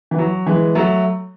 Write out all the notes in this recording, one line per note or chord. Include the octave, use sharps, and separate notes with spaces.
E3
F#3
E3 G#3
F#3 A3